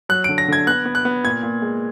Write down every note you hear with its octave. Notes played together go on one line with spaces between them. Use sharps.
F#3 F#6
D3 D7
A#6
D3 G#6
B3 F#6
B3
F#6
B3
A#2 G#6
A#2
G#3